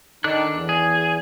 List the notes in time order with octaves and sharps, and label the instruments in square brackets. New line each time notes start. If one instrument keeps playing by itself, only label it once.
[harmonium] D#3 D#4 [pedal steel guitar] D4 A4 F#6
[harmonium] E2
[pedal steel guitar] G#4